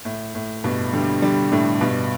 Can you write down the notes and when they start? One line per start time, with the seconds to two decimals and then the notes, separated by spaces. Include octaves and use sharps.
0.05 A2
0.35 A2
0.64 G2 B2
0.93 D3 G3
1.22 D3 G3
1.51 A2 D3
1.81 G2 B2